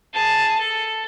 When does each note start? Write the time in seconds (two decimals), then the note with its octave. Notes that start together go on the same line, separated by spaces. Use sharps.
0.13 G#4 A5
0.60 A4